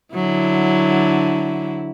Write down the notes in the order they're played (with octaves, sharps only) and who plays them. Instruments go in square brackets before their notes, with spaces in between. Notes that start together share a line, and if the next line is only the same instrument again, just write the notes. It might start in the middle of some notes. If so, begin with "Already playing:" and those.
[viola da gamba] D3 F#3 E4